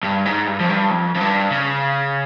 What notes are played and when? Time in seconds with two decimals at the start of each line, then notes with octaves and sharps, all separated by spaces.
0.03 G2
0.25 G#2
0.47 G2
0.60 F2
0.70 G2
0.91 F2
1.15 F2
1.21 G2
1.51 C#3